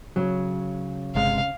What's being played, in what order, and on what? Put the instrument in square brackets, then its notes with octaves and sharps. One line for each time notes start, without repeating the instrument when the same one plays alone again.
[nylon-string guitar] C#3 [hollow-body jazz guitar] F#3
[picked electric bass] G1 C3 G#3 [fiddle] F5